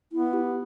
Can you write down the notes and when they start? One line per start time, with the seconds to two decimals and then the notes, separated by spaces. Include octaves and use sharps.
0.13 B3 E4
0.33 G4